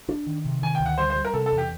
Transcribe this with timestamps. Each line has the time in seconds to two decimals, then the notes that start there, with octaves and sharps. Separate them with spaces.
0.08 D4
0.26 D#3
0.45 C3
0.62 D#3 G#5
0.75 G5
0.80 D2
0.86 F#5
0.98 G3 C5
1.10 C5
1.16 G3
1.25 A#4
1.33 C3 A4
1.46 A4
1.52 E2
1.58 G4